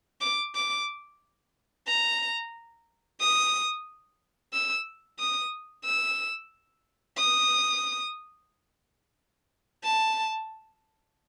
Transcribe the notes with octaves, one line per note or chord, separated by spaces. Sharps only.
D6
D6
A#5
D#6
E6
D#6
E6
D#6
A5